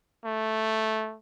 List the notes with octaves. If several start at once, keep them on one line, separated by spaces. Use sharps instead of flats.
A3